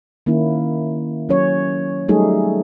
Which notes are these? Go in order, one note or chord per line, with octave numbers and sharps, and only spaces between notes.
D#3 A#3 C#4 E4
F#3 C#4 C#5
F#3 G3 A3 D#4 G#4 A4